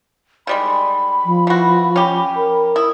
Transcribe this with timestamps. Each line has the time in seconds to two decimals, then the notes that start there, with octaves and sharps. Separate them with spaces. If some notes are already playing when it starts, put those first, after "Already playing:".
0.47 D#3 G3 G#3 B5
1.25 F3
1.47 E3 F#4
1.96 C#4 G4
2.36 A#4
2.76 E4 D#6